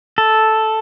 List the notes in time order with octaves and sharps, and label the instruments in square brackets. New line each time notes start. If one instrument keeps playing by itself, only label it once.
[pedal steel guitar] A4